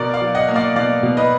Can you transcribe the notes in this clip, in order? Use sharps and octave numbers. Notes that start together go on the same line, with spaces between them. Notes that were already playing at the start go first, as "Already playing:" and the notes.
Already playing: B2 A#4 D5
D5 F5
F#3
D#5 F#5
A#3
D5 F5
B2 D5 F5
B2
B4 D#5